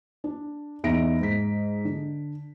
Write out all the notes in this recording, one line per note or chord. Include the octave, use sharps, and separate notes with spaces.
D4
E2 D#4 E5 A#6 D7
G#2 B6
D3